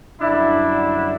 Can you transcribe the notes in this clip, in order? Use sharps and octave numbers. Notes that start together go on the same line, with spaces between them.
F#2 D3 G3 D4 E4